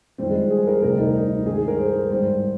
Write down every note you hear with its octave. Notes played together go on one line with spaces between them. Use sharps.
F2 D#3 G3 C4
G#3
G#4
A#4
D2 C3 G3 A#4
D#4
D#4
G2 D#3 G#3 G#4
G#4
A#4
C5
G#2 G3 C5